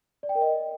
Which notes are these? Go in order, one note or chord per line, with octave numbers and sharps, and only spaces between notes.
D5
G5
A#4
D#5